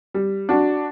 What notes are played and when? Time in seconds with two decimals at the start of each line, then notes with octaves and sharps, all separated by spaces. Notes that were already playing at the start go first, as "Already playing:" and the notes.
0.14 G3
0.49 D4 F#4